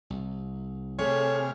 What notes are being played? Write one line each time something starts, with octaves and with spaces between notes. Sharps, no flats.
C2
C3 A3 G#4 C#5 F6